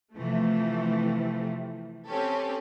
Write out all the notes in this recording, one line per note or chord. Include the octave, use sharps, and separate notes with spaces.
C3 E3 F3 A3
C4 C#4 G4 A4